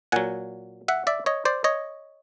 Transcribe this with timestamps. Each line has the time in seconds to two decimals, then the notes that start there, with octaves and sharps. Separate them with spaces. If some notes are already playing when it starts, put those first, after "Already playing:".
0.12 A#2 F#3 F#5 G#5
0.88 E5 F#5
1.07 D5 E5
1.26 C#5 D#5
1.45 C5 D5
1.64 C#5 D#5